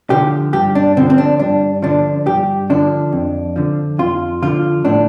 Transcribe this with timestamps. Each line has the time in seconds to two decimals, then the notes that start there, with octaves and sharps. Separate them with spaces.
0.10 D3 F3 G4
0.53 G2 G4
0.75 D4
0.97 D3 F3 C4
1.10 C4
1.18 D4
1.39 G2 D4
1.82 D3 F3 D4
2.26 G2 G4
2.70 D3 F3 D4
3.12 F2
3.56 D3 F3
3.98 F2 F4
4.42 D3 F3 F4
4.85 A2 D4